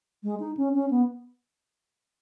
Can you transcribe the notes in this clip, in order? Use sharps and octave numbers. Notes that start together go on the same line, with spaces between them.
G#3
D#4
C#4
C#4
B3